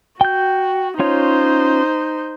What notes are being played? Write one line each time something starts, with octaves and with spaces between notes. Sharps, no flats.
F#4 G5 G6
C#4 D#4 F4 C5 C#5